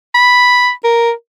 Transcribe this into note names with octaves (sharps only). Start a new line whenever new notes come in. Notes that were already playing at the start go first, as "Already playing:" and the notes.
B5
A#4